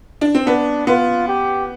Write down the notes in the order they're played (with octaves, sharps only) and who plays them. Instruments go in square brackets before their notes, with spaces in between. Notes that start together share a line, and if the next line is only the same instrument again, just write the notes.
[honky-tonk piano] D4
C4
[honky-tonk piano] B3 [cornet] D4
[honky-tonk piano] B3 [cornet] F4
[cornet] G4